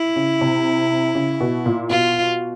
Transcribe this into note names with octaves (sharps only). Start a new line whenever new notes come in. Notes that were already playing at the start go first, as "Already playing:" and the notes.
Already playing: E4
C#3
C3
C#3
B2
A#2
B2 F4